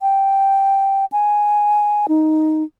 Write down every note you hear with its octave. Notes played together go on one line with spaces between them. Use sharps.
G5
G#5
D#4